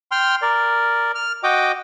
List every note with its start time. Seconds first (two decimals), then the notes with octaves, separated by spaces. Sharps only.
0.11 G5 C6 F6
0.42 A#4 D5
1.15 F6
1.43 F#4 D#5 G5 D6